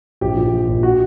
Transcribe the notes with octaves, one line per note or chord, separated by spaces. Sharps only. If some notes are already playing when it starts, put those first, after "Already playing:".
A#1 G4
A#2
F3
A#1
F#4